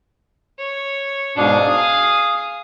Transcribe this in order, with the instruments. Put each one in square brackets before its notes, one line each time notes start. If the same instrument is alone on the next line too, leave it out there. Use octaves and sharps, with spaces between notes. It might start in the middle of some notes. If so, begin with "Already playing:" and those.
[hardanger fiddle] C#5
[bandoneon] G#2 B2 D4 [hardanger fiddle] G#4 F5
[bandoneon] D#6